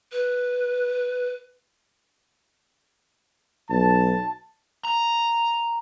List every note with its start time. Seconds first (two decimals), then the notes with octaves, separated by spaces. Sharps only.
0.12 B4
3.71 B1 A5
4.85 A#5